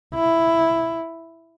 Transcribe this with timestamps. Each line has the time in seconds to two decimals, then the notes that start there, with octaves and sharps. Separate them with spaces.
0.14 E4